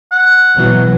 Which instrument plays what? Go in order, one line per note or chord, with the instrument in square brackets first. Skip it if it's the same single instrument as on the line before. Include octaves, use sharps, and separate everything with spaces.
[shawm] F#5
[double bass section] B2 E3 F#3